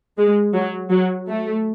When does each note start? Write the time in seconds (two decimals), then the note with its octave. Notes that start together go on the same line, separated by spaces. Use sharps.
0.18 G#3
0.54 F#3
0.91 F#3
1.28 A3